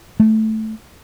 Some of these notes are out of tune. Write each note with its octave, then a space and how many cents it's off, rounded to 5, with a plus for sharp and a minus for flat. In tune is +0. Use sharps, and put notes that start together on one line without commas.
A3 -5